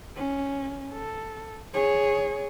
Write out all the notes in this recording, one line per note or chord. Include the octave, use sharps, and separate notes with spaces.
C#4
A4
G#4 C#5